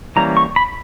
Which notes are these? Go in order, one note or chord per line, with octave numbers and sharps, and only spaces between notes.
E3 G3 A#3 C#4 A#5
C#6
B5